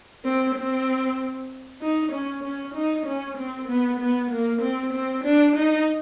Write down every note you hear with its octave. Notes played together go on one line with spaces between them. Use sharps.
C4
C4
D#4
C#4
C#4
D#4
C#4
C4
B3
B3
A#3
C4
C4
D4
D#4